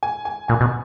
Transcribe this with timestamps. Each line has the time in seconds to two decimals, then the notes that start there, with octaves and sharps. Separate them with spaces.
0.03 G#5
0.25 G#5
0.48 A#2 G#5
0.61 B2